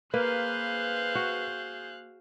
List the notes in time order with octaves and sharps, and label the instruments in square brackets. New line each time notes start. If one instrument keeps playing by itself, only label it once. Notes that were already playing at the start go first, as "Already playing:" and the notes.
[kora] A#3 [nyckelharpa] G#4 C5 [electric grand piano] B4 [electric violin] F5 F#6
[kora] F#4